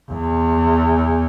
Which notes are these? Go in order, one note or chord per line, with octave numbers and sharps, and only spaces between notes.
E2